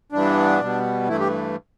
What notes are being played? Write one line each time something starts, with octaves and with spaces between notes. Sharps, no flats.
G2 E3 B3 D4
B2 G3 B3
G2 E3 A3 E4
G4